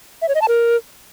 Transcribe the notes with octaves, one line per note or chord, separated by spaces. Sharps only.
E5
C#5
D#5
A5
A#4